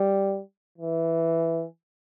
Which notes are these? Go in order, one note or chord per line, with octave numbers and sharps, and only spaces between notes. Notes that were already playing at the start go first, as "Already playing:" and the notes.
Already playing: G3
E3